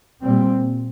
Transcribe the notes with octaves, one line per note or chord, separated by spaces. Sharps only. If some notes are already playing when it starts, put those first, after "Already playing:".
A#2 G3 C4